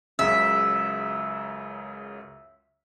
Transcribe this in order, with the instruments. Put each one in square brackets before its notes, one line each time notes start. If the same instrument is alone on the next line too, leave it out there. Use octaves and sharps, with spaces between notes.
[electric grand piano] C#2 F#2 C#3 [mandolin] E5